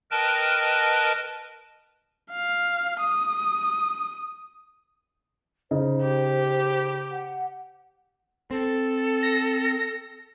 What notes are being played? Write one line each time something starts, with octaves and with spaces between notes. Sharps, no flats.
A#4 B4 D#5 G5 A5 F6
F5
D#6
C#3 D#4 C5
G4
F#5
C4 A4
A#6